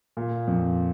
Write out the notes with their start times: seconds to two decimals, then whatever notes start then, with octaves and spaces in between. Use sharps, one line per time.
0.17 A#2
0.47 F2